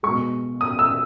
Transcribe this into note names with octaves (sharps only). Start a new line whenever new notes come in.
B2 G#3 C#6
D#6
E6